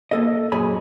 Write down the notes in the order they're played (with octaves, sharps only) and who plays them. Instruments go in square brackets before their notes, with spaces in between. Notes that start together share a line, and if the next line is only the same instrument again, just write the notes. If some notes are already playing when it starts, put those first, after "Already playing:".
[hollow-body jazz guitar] A#3 A4 D#5
F#2 A#2 G#4 C#5 G#5 B5